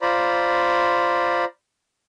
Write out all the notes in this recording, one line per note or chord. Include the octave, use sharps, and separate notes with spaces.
F4 C5 D5 A#5 B5